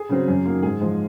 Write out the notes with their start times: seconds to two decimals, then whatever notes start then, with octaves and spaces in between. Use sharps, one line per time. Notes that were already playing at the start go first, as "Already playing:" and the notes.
Already playing: G#4
0.09 C#3 F#3 C4
0.28 F#2
0.45 D#3 F#3 A#3
0.62 G#2 G#4
0.81 F3 G#3